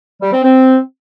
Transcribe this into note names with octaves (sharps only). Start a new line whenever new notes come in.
G3
C4
C4